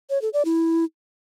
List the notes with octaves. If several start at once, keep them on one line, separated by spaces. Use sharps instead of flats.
C#5
A4
D5
E4